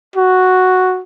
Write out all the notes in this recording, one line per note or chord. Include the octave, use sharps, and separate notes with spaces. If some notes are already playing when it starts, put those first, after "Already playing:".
F#4